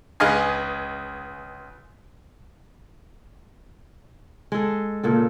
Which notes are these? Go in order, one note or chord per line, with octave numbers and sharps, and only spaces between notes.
C#2 G#4 B4 D#5 F5 G#5
G#3 A4
A#2 C#3 A4